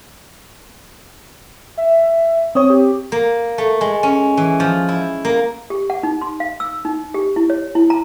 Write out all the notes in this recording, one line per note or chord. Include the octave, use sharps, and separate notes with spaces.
E5
C4 C#5 D#6
G4
A#3
A3
G#3
C#4
E3
F3
E4
A#3
G4
F#5
D#4
C6
F5
E6
D#4
G4
E4
C#5
E4
A#5